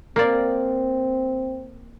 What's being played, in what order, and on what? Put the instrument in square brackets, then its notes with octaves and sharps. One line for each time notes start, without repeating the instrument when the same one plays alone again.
[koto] A#3 D5 [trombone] C4